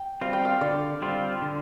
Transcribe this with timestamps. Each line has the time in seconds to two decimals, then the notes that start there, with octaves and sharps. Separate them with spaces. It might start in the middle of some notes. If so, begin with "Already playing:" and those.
Already playing: G5
0.21 G3 C4 F4 F5
0.33 G5
0.45 F5
0.61 D3 D5
1.02 G3 C4 F4
1.42 D3